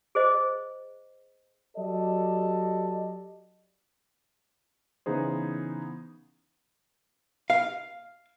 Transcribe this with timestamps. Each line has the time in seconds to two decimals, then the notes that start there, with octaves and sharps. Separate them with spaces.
0.15 G#4 C5 D#5
1.77 F#3 G4 A4 D5 D#5
5.06 C#3 E3 B3 D#4 G#4 C5
7.50 F5